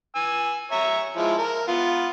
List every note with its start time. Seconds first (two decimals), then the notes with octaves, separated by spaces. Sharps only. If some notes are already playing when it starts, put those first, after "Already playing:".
0.15 G#5 E6
0.72 C#5 E5 A#5
1.17 F3 G#3 E4
1.38 A#4
1.68 B3 F4